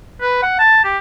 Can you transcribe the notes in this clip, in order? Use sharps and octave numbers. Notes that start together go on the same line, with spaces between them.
B4
F#5
A5
G4